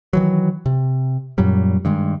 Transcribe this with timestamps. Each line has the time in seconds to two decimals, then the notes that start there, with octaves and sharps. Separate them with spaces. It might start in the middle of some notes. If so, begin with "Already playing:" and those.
0.13 D#3 E3 F#3
0.66 C3
1.38 F#2 A#2 F#3 G3
1.85 G2 D#3 G#3